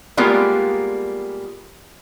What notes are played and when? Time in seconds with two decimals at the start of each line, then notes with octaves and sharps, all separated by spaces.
0.17 G3 G#3 A#3 B3 F4